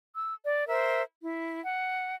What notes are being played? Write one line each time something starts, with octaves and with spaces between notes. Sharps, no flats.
E6
D5
A#4 C5 E5
E4
F#5